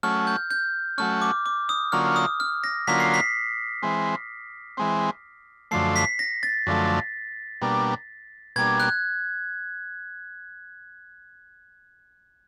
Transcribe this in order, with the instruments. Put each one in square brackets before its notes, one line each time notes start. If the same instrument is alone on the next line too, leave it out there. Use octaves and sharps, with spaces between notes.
[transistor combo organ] F#3 A3 C#4 [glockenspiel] F6
[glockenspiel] G6
G6
[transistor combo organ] F#3 A3 C#4 [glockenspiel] F6
[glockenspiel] D6
D6
D#6
[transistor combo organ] D3 F#3 A#3 C#4 F4 [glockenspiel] F6
[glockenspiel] D#6
F6
A#6
[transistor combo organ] D3 F#3 A#3 C#4 F4 [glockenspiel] B6
[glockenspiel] C7
B6
[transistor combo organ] E3 G#3 C4
E3 G#3 C4
[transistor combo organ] F#2 D3 F3 A3 [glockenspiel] C7
[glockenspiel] B6
A#6
A6
[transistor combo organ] F#2 D3 F3 A3
B2 G3 A#3 D4
[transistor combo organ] B2 G3 A#3 D4 [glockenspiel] G#6
[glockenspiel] F#6